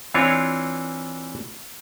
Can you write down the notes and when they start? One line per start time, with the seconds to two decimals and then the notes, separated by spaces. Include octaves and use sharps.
0.14 E3 C4 D4 F4 C#5